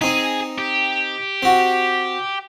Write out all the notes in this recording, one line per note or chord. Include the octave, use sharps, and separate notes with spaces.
C4 D#4 G#4
G4
C4 F#4